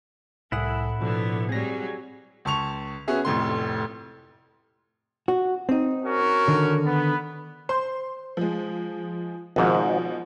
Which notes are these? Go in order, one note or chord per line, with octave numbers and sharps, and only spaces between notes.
C2 A2 E4 A4 F#5 G#5 D#6
B2 D3 F3 B3
F#3 G3 C4 G#4 A#6
C#2 A5 C#6 F7
B3 C#4 F#4 G#4 E5
F1 F2 A2 C6
F#4
C4 D#4
C#4 F#4 A#4
D3 D#3
B3
C5 C6
F3 G#3
G#1 G#2 B2 F3